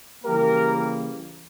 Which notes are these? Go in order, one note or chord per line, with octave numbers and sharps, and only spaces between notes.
C#3 E3 G3 A#3 G4 A#4